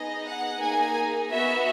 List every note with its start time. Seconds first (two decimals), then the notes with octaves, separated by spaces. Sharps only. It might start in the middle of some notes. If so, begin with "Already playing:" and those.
Already playing: B3 D#4 G#4 D#5
0.26 F#5
0.60 A#3 D#4 G#4 G#5
1.30 B3 F#4 E5